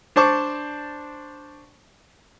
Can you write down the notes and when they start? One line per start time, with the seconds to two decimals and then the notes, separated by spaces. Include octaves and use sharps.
0.16 D4 C5 A5 C#6 D6